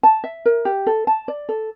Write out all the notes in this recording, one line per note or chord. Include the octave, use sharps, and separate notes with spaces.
A5
E5
A#4
G4
A4
A5
D5
A4